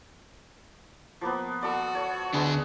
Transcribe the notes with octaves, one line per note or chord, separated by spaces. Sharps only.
F3 A#3 B3
F#4 A4 D5
C#5
D2 G#3 B3 D4